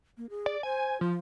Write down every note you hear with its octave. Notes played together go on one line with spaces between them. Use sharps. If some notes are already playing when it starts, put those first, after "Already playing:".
A#3
G#4
D5
C5 G#5
F3 F4